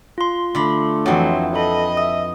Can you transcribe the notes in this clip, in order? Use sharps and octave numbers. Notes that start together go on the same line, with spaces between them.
F4 C6
D3 A3 B5
F2 E3 F#3
A4 D#5 B5
E5 D#6